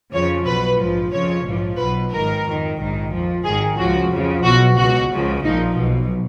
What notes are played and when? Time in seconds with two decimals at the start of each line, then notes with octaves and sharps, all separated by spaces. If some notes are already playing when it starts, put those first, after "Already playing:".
0.12 F2 C#3 F3 C#5
0.46 B1 B2 B4
0.79 A#1 G#2 F3
1.12 F2 C#3 F3 C#5
1.45 A#1 G#2 F3
1.79 B1 B2 B4
2.12 G#1 G#2 D#3 A#4
2.45 F2 D#3
2.78 A#1 G#2 D#3
3.12 F2 F3
3.44 G#1 G#2 D#3 G#4
3.78 C#2 C#3 F3 F#4
4.11 F2 C#3 F3
4.44 B1 B2 F#4
4.77 C#2 B2 F#4
5.11 C#2 C#3 F3
5.44 A#1 A#2 F3 D#4
5.77 B1 B2